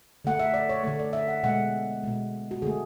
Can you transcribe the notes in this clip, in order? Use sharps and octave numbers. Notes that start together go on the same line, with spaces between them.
D3 A3 F#5
E5
D5
C#5
D3 A3 C#5
D5
E5
F#5
B2 G#3 F#5
B2 G#3
F#4
D3 A3 G#4